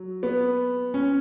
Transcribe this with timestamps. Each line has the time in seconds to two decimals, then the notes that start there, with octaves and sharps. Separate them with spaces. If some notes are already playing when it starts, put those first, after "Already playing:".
Already playing: F#3
0.23 B3
0.94 C#4